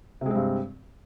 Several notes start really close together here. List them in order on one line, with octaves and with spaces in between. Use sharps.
C3 G#3 C4 G2